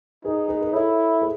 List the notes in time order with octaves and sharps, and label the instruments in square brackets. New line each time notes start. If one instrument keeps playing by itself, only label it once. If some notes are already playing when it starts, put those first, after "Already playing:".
[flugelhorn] D#4 [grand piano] G#4 B4
[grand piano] G#4 B4
B4
[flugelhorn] E4 [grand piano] A4 C#5
[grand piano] G#4 B4